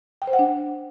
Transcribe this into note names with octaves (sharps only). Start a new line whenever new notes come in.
G5
C5
F#5
D4